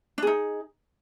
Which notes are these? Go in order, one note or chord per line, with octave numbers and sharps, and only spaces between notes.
D4 D#4 G#4